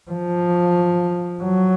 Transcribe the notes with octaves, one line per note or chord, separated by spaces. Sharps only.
F3
F#3